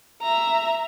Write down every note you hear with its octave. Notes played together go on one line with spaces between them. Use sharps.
E5 A#5